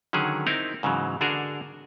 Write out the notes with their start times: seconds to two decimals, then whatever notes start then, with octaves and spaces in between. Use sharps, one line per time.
0.13 D3 D#3 F#3 C#4 G#4
0.47 C4 D#4 E4 A#4
0.83 G#2 C#3 E3 F#3
1.21 D3 D4 F#4 G#4 A#4